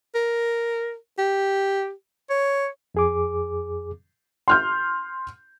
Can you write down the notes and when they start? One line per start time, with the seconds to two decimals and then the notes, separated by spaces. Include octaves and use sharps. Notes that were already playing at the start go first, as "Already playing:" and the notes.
0.15 A#4
1.18 G4
2.30 C#5
2.94 F2 G#4 D6
4.48 C6 F6 G6